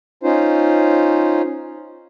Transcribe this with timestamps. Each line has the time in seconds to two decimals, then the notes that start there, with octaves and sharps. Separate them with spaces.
0.23 C#4 D#4 F4 C5